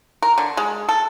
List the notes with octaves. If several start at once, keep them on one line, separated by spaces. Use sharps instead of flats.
A#4
D3
G#3
A4